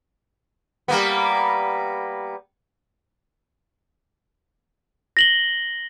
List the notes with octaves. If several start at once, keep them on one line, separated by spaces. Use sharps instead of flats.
G3 A#3 B3
A#6 F#7 G7